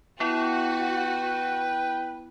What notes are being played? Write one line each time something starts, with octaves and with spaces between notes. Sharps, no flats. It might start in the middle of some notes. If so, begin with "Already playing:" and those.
B3 E4 F#4 B4 G5